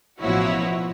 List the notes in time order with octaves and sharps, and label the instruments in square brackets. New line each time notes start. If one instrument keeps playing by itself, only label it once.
[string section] A1 B2 F3 E4 F#4 C#5